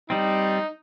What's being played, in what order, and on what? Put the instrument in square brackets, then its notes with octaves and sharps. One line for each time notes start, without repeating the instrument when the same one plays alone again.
[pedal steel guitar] G3 C4 [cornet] D#4